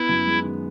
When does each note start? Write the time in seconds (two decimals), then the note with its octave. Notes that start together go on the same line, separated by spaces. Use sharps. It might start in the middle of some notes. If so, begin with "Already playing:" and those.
Already playing: B3 E4
0.09 F#2
0.26 G#3
0.44 D#3